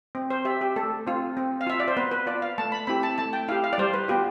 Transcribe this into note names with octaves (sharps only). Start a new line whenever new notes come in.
C4
C5
G4 E5
G4
A3 A4
C4 F4
C4
F5
F4 E5
D5
C5
B3 B4
B4
F4 D5
F5
A3 A5
B5
C4 E4 G4 B5
A5
A3 A5
G5
E4 G4 F5
F5
D5
G3 C5
B4
B3 F4 G4